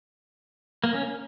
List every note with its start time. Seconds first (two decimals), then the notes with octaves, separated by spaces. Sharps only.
0.84 A#3
0.94 C#4